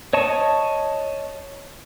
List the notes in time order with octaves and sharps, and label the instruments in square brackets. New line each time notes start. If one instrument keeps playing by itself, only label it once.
[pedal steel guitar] C#5 D#5 A5 C#6